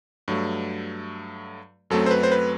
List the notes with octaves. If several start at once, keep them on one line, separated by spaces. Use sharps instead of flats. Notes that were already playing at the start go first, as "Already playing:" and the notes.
G2 F#3 A3
F#2 F#3 A3 C4 A4
C5
B4
C5
B4